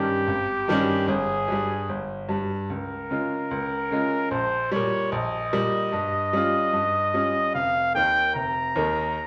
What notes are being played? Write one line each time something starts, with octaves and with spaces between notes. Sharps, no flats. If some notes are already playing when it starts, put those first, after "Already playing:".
Already playing: G2 D#3 G3 C#4 G4
G#1
G2 D#3 G3 C#4
G1 G#4
G2 G3
G1
G2 G3
C#2 A#4
C#3 G#3 C#4 F4
C#2
C#3 G#3 C#4 F4
A#1 C5
A#2 G3 C#5
A#1 D#5
A#2 G3
G2
G3 C#4 F4
G2
G3 C#4 F4
F1 F5
D#2 D#3 A#3 G5
F1 A#5
D#2 D#3 A#3